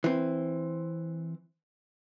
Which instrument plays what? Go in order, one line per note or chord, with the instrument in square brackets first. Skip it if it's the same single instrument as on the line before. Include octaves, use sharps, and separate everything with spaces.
[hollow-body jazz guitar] E3 C4